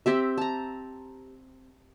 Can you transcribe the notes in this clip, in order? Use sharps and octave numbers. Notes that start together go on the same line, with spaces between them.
C4 G4 E5
A5 A#5